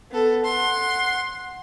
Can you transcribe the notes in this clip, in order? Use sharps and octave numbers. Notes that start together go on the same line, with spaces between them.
B3 A4
F#5 C6